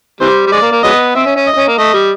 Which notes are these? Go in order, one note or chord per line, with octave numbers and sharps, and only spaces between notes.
C3 E3 G3 C5
G3
G#3 D5
A#3
A#3
F#3 G#3 B3 D#5
C4 E5
C#4
C#4
D#5
C#4
A#3
A3 D#5
G3